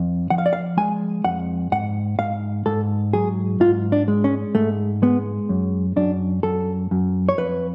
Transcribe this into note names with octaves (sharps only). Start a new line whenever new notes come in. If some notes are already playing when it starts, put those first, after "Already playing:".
Already playing: F2
F3 F#5
F5
D5
F5
G#3 G#5
F2 F#5
G#2 F#5
G#2 F5
G#2 A4
F#3 G#4
G#2 F4
D4
G#3
C#4
G#2 A3
G#3 B3
F#2
F#2 D4
F#2 A4
F#2
C#5
F2 B4